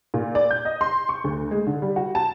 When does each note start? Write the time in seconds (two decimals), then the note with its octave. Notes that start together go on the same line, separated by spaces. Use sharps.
0.14 A#2
0.35 D5
0.51 G6
0.65 D#5
0.81 C6
1.09 C#6
1.24 D2
1.51 G#3
1.67 D3
1.82 G3
1.96 F#4
2.15 A5